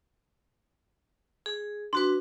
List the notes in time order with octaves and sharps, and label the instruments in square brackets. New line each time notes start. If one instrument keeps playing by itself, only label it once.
[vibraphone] G#4
[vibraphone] D4 F#4 B4 [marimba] C6